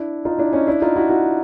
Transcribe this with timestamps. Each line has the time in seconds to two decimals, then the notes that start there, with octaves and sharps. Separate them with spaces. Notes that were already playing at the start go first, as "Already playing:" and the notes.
Already playing: D4 E4
0.25 D#4 F4
0.38 D4 E4
0.53 C#4 D#4
0.67 D4 E4
0.82 D#4 F4
0.95 E4 F#4
1.09 E4 F#4